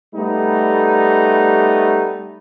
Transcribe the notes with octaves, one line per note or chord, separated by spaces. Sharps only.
G3 A3 B3 D#4